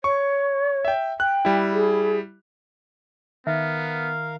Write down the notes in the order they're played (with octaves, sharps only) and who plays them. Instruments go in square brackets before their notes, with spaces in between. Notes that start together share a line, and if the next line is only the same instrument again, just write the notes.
[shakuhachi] C#5 [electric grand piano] C#6
[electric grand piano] E5 G5
[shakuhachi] G5 [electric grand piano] F#6
[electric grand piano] G3 E4
[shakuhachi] G#4
[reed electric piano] D#3 [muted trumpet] B3 [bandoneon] A#4 F5 [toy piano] E5